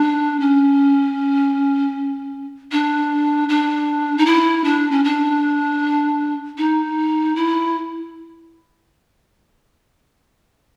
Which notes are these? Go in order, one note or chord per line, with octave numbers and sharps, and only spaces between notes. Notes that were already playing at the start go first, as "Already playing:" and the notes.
Already playing: D4
C#4
D4
D4
D#4
E4
D4
C#4
D4
D#4
E4